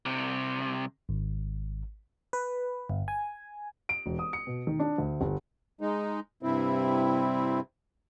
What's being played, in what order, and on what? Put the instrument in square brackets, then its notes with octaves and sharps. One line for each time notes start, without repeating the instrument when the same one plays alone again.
[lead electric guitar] C2 C3
[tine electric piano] G#1
[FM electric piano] B4
G1
G#5
[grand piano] D7
E1
D#6
C#7
B2
D#3
D4
D2
G1
[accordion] G#3 D#4
G2 C3 C4 E4